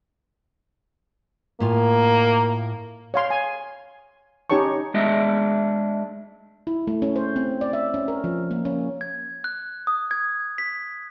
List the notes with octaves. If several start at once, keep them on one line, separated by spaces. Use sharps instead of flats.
A2 A#3 F4 G#5
C#5 F5 C6
G#5
C#4 D#4 G4 C#5 A5 C#6
G#3 D4 D#5 E5
E4
A3
C#4
C5
C4
D5
E5
C#4
A#4
F3
A#3
C#4
G#6
F#6
D#6
G#6
B6